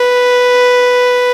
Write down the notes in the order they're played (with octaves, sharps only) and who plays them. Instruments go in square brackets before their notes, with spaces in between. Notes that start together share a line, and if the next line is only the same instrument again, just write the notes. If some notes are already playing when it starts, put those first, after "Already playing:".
Already playing: [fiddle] B4